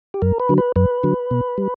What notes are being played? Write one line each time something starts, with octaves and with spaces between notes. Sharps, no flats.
G4
F#2 A#4
B4
D3 F#3
B4
F#2 B4
D3 F#3
B2
G3